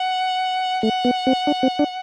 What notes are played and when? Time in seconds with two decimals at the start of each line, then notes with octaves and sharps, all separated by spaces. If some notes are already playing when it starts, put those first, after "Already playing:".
Already playing: F#5
0.83 A3 F#5
1.05 B3
1.27 C4
1.47 D4
1.63 C4
1.79 D4